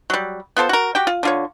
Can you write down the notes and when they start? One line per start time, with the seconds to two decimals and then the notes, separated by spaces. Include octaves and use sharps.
0.10 F#3 G3
0.57 B3 F4 A4 C5
0.69 F#4 A#4
0.95 F#4 G4 G5
1.07 F4
1.23 D3 F4 C#5